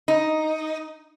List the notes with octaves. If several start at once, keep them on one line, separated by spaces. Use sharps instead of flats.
D#4